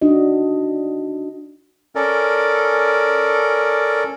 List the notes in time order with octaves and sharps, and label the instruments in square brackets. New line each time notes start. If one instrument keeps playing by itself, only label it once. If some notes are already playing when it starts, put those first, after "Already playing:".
[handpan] D4 D#4 F#4 D#5
[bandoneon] C#4 A4 A#4 D5